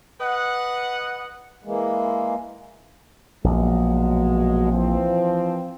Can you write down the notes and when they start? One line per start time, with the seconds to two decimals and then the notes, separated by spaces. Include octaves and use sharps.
0.21 B4 D#5 F#5
1.64 E3 G#3 A#3
3.44 A#1 B2 F#3 G#3
4.71 E3 F3 C4